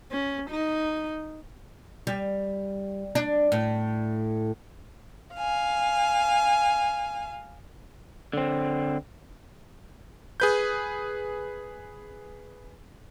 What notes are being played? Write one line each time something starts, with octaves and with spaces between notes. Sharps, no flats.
C#4
D#4
G3
D4
A2
F5 G#5
D3 C4
G#4 B4 G6